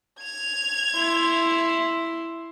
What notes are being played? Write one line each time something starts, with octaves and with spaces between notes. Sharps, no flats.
G#6 F7
E4 C6